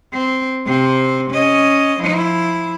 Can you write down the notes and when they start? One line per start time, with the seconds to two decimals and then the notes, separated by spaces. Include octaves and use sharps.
0.14 C4
0.66 C3 C4
1.31 C#4 D#5
2.00 F3 E4